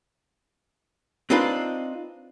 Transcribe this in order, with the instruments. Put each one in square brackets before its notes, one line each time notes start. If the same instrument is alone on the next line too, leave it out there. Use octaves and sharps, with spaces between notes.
[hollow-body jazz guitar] C4 D4 D#4 F4 B4